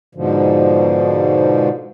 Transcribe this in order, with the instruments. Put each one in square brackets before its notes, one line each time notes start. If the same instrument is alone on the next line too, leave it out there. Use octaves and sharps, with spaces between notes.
[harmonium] G#2 B2 D3 F3